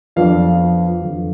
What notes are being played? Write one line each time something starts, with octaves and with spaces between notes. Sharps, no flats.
F2 F3 B3 D4 F5
F2 D3 F3